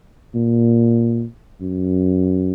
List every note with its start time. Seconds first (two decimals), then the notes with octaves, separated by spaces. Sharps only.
0.35 A#2
1.61 F#2